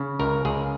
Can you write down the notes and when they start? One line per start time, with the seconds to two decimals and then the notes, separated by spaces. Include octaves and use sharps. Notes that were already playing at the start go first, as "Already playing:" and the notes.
Already playing: C#3
0.19 C#2 A#4
0.45 C#2 G#4